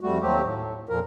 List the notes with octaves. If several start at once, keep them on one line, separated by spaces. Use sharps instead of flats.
F2 G3 A3 F#4
D#2 F#3 A3 C4 G4
A2
F2 A#2 F3 A#4